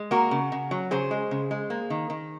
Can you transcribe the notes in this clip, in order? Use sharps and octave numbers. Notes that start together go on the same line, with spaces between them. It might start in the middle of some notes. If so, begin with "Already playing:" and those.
Already playing: G#3
A#3 F#4 A#4
C#3
C#3
F#3
C#3 G#4 C5
G#3
C#3
G#3
A#3
D#3
D#3